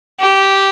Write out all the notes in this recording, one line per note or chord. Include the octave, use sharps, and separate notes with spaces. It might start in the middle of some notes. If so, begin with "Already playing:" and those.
G4